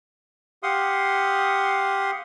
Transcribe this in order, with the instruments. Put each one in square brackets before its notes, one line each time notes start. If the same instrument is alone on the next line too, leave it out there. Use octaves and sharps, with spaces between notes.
[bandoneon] G4 F5 F#5 C6 D#6